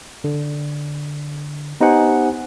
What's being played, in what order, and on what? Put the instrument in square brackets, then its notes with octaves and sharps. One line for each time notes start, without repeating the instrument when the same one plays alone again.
[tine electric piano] D3
B3 D#4 G4 C5 F#5 G#5